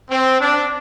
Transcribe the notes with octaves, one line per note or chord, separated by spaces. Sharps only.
C4
D4